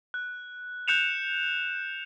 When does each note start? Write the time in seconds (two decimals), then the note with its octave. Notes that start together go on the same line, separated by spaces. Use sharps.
0.14 F#6
0.88 F#6 G6 C#7 E7 F7